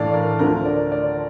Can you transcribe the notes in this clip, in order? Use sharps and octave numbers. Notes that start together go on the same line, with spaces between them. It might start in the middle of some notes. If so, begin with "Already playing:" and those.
Already playing: A2 E3 A3 D4 D5 F5
A#4
D2 D3 F3 A#4
D5
D5